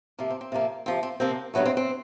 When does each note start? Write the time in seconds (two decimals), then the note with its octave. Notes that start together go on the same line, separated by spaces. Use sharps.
0.19 C3 F3 A#3
0.30 C4
0.41 C4
0.52 C3 F3 A#3
0.86 C3 F3 A#3 C4
1.03 C4
1.20 C3 F3 A#3 C4
1.54 G2 D#3 F#3 A3 B3
1.66 C4
1.77 C4